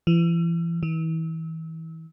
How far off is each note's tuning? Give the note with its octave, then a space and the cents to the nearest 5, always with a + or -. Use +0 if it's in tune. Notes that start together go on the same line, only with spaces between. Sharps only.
E3 +35
E3 -35